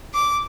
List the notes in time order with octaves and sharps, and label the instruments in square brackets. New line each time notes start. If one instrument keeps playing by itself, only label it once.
[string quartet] D6